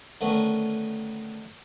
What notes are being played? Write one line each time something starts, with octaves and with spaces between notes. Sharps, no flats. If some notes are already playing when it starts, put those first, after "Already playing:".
D3 D#3 A3 B3 C#4